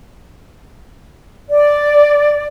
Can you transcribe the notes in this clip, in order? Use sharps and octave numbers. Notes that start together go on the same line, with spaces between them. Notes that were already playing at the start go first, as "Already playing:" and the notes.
D5